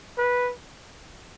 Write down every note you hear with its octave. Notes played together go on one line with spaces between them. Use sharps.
B4